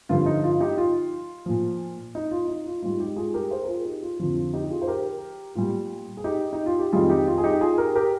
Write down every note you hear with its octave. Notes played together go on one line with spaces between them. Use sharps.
G2 D3 F3 F4
D#4
F4
D#4 G4
F4
A#2 F3
D#4
F4
D#4
F4
G#2 G3 F4
D#4 G4
F4 G#4
G4 A#4
G#4 C5
A#4
F4 G#4
D#4 G4
F4
F2 D3 F3 F4
F4
D#4 G4
G4
F4 G#4
C5
G4 A#4
A#2 G3 F4
G#4
D#4 G4
D#4
F4
G4
F2 D#3 G3 F4 G#4
D#4 G4
F4
G#4
D#4 G4
F4 G#4
G4 A#4
G4 A#4